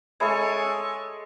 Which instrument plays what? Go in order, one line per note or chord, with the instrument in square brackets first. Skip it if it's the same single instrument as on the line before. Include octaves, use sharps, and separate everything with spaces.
[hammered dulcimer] G#3 A4 C#6 [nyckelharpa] C#5 G#5 [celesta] E5 B5 G#6